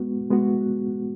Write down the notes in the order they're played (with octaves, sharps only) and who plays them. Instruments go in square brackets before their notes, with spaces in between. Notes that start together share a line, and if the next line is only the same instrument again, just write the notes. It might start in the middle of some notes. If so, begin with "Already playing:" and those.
Already playing: [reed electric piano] G#3 B3 F#4
G#3 B3 F#4